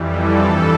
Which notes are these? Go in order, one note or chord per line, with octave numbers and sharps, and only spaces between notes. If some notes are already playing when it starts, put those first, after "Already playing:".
Already playing: F2 E3 G3
A4
G2 E3 G3